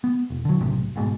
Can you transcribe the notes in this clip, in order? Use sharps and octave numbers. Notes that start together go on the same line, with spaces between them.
B3
E1
D3 F#3
B1 F#2 A2 C3
F#1 G#2 B2